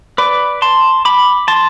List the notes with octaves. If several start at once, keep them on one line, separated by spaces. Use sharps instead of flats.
B4 D5
A5 C6
B5 D6
A5 C6